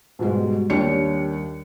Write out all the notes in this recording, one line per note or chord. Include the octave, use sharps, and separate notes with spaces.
G#2 B2 G3 G#3
D#2 G3 D4 G4 C#5 C#7